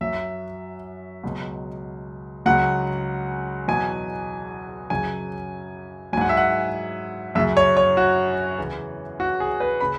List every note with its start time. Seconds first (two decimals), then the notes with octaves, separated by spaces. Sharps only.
0.01 F#2 F#3 E5
1.24 C#2 B2 F#3
2.46 C#2 C#3 F#3 F#5
3.68 E2 B2 F#3 G#5
4.90 F#2 C#3 F#3 G#5
6.13 F#3 G#5
6.17 G#2 F#5
6.29 E5
6.37 F#5
7.35 F#2 C#3 F#3 E5
7.57 C#5
7.77 C#5
7.97 F#4
8.58 E2 C#3 E3
9.20 F#4
9.40 G#4
9.60 B4
9.80 C#3 B5